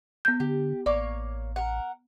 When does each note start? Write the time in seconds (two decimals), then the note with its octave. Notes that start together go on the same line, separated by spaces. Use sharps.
0.25 B3 G6
0.40 D3 G4
0.86 A1 A#3 C#5 D5 D6
1.56 A#4 F#5